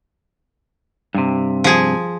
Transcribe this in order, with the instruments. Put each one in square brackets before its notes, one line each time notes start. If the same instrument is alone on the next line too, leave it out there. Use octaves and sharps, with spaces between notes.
[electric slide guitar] G2 C3
[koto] F3 G#4